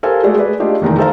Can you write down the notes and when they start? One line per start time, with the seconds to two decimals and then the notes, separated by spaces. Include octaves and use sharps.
0.03 G4 A4 A#4 C5 F5 G#5
0.23 G#3 A3 F#4 G#4 D5
0.37 G#4 B4 D5
0.60 A3 D4 F4 G4 G#4 D#5
0.82 F1 E2 D#3 G#3 A#5
0.98 A4 C5 F5 A#5